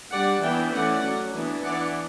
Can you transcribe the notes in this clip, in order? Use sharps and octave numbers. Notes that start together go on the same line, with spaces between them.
G3 D4 D5 F#5
E3 B3 D4 E5 G5
E3 A3 C#4 D5 F#5
F#3 C#4
E3 B3 D4
E3 B3 D4 D5 F#5